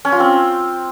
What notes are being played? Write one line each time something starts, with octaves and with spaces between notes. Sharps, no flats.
C#4
F4
C4